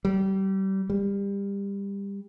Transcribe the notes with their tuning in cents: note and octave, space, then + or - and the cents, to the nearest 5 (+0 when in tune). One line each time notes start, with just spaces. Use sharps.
G3 -30
G3 +25